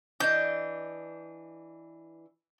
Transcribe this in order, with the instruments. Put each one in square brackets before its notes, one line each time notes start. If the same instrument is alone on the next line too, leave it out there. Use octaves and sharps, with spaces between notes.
[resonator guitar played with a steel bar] E3 D4 D#5 [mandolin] G6